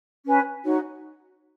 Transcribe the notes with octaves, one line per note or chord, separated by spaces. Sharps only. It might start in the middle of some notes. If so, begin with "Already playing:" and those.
C#4 B4 G#5
D#4 F#4 C#5